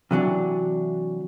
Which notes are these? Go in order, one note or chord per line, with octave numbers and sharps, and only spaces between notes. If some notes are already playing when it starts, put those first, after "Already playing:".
C3 E3 F#3 D4